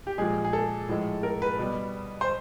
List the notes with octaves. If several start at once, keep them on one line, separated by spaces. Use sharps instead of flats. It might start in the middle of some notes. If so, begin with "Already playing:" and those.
G4
A#2 F3 G#3 G#4
G#4
A4
A2 F3 G#3
A#4
B4
B2 G3
C5